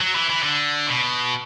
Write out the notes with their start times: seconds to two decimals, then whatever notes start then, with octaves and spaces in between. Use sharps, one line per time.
0.01 F#3
0.15 E3
0.30 E3
0.43 D3
0.87 B2